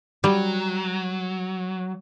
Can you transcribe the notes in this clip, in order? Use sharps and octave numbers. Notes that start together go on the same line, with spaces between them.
F#3 G3